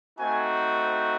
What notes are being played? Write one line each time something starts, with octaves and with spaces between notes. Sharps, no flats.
A3 C4 D#4 F#4 G#5